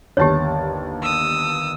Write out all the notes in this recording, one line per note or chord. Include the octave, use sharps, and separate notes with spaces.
G1 D#2 G4 C#5 A5
D#6 E6